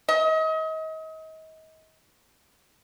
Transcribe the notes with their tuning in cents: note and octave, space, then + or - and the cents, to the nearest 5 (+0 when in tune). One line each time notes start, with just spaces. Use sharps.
D#5 +35